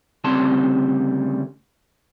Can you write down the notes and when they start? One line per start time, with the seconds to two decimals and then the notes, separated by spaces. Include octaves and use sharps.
0.24 D2 C#3 G3 C4 A5 C6